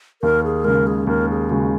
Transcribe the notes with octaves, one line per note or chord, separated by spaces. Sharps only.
D#2 A#4
G#4
C#3 G#3 A#4
G#4
D#2 A#4
G#4
C#3 G#3 F#4